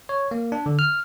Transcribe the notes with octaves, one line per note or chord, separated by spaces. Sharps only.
C#5
A#3
D4
D3
F6